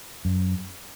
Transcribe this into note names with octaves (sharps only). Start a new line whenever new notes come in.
F#2